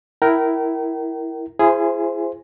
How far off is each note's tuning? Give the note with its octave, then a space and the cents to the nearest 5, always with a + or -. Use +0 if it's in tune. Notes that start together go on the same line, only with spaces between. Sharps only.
E4 +0 A#4 +0 G5 -35
E4 +40 G#4 +0 C5 +0